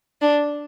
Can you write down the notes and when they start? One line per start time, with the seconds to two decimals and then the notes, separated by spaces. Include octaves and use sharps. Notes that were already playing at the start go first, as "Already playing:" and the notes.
0.21 D4